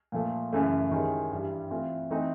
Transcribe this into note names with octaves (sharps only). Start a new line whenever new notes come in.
A#2 F3 A3
F#2 C#3 E3 A3
D#3 G#3 C#4 E4 G4
G2 E3 G3
E3 A3 C4 F4
E3 A3 C4 D#4